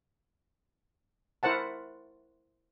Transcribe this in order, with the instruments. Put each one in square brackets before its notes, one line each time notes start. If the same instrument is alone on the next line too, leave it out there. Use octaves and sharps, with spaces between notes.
[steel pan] E4 A#4 C5 F#5 A5